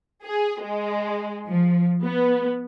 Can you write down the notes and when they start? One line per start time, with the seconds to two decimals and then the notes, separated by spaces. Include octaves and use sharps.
0.25 G#4
0.63 G#3
1.49 F3
2.03 B3